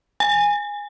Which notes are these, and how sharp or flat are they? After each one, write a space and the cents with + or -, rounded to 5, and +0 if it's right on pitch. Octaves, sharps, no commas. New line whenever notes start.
G#5 -10